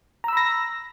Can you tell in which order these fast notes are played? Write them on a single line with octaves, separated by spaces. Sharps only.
A#5 E6 B5 A#6